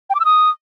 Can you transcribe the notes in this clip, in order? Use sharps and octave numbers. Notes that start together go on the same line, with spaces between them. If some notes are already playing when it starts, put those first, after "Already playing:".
G5
D6
E6
D#6